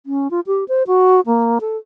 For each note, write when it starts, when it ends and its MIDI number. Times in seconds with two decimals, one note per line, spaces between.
0.06 0.30 61
0.31 0.40 65
0.47 0.64 67
0.68 0.83 72
0.87 1.20 66
1.26 1.59 58
1.61 1.77 69